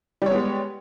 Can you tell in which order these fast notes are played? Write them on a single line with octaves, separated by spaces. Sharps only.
G3 C#5 B3 G#3